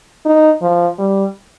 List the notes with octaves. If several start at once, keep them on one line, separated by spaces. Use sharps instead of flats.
D#4
F3
G3